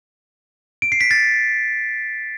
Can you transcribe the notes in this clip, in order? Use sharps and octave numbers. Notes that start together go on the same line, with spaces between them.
D7
C7
B6
A6